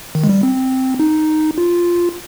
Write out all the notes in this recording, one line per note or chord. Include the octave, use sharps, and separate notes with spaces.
D#3
G#3
G3
C4
D#4
F4